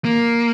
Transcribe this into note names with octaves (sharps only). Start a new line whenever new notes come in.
A#3